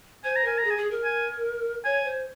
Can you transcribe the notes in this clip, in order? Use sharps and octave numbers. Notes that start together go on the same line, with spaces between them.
C5 G#5
A#5
A#4 G#5
A#5
G#4
G#5
G#4
A#4
G#5
C#5 G#5
C5